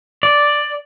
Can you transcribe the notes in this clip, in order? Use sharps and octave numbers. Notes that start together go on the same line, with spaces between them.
D5